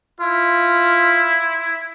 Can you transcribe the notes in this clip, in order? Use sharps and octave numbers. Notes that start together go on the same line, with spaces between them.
E4 F4